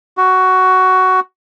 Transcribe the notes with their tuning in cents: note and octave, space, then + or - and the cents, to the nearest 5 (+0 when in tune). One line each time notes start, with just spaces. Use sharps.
F#4 +10